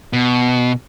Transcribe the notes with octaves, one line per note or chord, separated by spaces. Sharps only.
B2